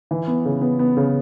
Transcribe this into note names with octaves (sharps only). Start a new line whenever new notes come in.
E3
B3
C#3
B3
B3
C#3